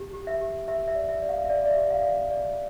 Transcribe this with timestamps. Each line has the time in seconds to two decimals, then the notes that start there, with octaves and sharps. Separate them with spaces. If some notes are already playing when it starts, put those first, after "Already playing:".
Already playing: G4
0.13 G4
0.27 E5
0.41 G4
0.68 G4 E5
0.88 E5
0.95 D5
1.09 E5
1.22 D5
1.29 F5
1.45 E5
1.50 D5
1.66 D5
1.70 E5
1.76 G4
1.90 F5
2.03 D5
2.31 D5